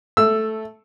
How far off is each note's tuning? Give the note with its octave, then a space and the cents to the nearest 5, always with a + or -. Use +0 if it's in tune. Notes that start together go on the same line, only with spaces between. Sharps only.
A3 +0 E6 +10